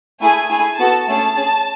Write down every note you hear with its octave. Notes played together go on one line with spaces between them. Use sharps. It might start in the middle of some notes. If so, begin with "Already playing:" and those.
A3 E4 G#4 G#5
A3 E4 G#4 G#5
B3 F#4 A4 A5
A3 C#4 G#4 A5
C#4 G#4